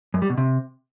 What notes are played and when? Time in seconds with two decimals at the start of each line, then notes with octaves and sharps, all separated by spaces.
0.14 F#2
0.22 G3
0.30 B2
0.38 C3